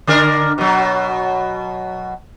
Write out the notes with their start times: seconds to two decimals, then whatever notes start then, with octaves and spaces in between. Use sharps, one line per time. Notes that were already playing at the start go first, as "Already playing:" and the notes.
0.07 D3 D4 A#4
0.58 B2 F#3